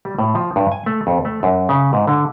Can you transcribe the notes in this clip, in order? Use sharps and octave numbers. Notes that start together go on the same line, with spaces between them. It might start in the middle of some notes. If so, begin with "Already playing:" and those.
G3
A2
F3
G2
G#5
A3
F2
A3
F#2
C#3
G#2
D3